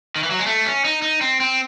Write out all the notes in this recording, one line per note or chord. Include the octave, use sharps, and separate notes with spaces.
D#3
E3
F#3
G#3
A3
C#4
D#4
D#4
C4
C4